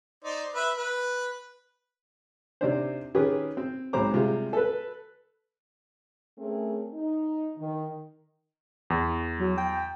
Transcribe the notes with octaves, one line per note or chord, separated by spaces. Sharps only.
D#4 C5 D5
B4 E5 B5
B4
C3 C4 D4 D#4 C5
D#3 C#4 G4 G#4 B4
C4
B1 G#2 C4 C5 A#5 D6
C3 G3 G#3 F4
A4 B4
A3 C4 C#4 G#4 A#4
D#4
D#3
E2
F#3
G5